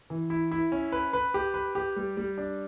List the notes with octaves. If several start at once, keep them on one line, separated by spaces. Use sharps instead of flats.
E3
E4
E4
C#4
B4
B4
G4
B4
G4
G3
G3
D4